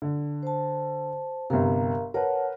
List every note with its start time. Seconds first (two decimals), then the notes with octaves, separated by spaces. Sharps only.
0.02 D3
0.43 C5 A5
1.50 G1 C3 A#4 F5 A#5
2.14 A#4 B4 C#5 F#5 A5